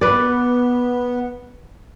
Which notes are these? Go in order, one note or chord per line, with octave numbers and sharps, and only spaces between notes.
B3 B4 D5